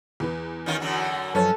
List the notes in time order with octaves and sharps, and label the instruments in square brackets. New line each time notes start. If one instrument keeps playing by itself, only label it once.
[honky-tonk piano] E2 E3 B4
[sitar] D#3 C#4 F4
F#2 D3 F#3
[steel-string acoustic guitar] F#2 F3 [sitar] C#4 [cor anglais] A4 [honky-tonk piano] B4 C#5